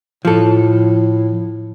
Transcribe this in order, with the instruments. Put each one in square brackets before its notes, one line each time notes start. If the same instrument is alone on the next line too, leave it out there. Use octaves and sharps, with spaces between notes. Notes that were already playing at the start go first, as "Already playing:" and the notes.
[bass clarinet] A2 [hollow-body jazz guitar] F3 A4